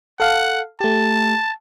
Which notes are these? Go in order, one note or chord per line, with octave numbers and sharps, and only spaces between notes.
A4 F5 F#5
A3 G4 A5